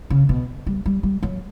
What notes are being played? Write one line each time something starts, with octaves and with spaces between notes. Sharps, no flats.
C#3
B2
G3
G3
G3
F#3